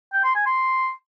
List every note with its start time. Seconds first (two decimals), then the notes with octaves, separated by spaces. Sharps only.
0.13 G5
0.24 C6
0.35 G#5
0.46 C6